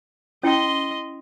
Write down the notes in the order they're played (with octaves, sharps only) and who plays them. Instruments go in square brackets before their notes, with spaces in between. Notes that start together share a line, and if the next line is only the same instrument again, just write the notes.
[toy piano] C#4 E4 G5 [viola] D#5 C6